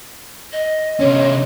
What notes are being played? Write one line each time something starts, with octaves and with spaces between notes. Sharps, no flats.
D#5
C3 C#4 C#5